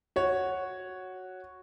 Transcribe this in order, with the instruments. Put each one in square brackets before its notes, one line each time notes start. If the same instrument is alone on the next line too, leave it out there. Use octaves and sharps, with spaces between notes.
[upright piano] F#4 C#5